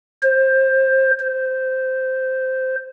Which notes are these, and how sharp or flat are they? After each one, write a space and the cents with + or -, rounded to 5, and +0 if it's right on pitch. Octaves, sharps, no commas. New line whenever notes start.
C5 +20
C5 -5